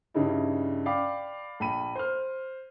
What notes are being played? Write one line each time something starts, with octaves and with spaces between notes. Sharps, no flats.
G2 C#3 G3 D#4 E4
D5 F5 G5 B5 D6
A#1 B5 D#7
C5 F6